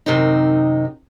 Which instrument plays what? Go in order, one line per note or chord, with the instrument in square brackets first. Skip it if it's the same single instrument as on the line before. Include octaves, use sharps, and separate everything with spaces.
[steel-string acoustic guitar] F#2 C3 D#3 C4 D#4